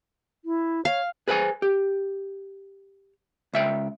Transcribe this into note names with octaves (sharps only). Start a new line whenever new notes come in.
E4
C#5 F5
G#4 B4 C5 E5 G#5
G4
C#2 E5 G5